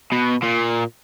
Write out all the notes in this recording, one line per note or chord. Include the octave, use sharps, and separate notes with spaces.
B2
A#2